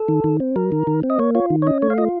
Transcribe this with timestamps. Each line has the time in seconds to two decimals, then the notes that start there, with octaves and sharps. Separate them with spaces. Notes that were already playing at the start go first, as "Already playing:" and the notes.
Already playing: A4
0.08 D#3
0.24 D#3
0.40 C4
0.56 F#3 A#4
0.72 D#3
0.87 D#3
1.03 C4
1.10 D#5
1.19 A#3 C#5
1.35 F4 C#5
1.50 D#3
1.62 C#5
1.67 C#4 D#5
1.82 A3 C#5
1.90 F5
1.98 F4 D#5